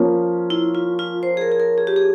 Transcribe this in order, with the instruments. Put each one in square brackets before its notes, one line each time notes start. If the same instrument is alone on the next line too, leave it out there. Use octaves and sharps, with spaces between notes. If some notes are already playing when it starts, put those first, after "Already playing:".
Already playing: [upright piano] F3 A#3 C#4
[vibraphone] E4
F4
F4
C5
G#4
A#4
G#4
A#4
G#4
G4
G#4